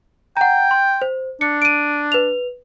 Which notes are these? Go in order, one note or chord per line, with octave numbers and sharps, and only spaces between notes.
F#5 G5 A#5
C6
C5
D4 C#7
D7 D#7
B4 F7